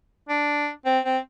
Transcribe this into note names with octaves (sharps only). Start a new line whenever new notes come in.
D4
C4
C4